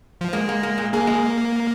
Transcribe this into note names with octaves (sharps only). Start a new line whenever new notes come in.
F3
G#3 A#3
A#3
A#3
A#2
A#3 G#4
G#3